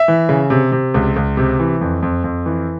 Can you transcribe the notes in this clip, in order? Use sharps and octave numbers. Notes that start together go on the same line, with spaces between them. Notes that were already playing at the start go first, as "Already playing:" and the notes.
Already playing: E5
E3
C#3
C3
C3
C#2
C#2
C3
E3
F2
F2
F2
E3